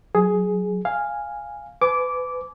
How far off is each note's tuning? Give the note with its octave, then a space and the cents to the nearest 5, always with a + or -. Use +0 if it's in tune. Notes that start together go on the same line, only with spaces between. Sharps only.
F#3 +0 G#4 +10
F5 +0 G#5 -10
B4 +30 G#5 +30 D6 -15